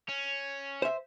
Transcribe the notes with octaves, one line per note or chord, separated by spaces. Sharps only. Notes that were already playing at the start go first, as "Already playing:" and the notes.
C#4
C5 E5